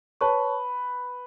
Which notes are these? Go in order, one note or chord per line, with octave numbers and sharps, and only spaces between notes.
B4 C#5 A5 C#6